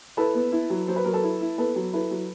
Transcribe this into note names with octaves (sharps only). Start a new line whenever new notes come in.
E4 A4 B4
B3
E4
F#3
F#3 C5
B4
F#3 A#4
A4 B4
E4
E4
B3 A4 B4
F#3
E4 A4 B4
F#3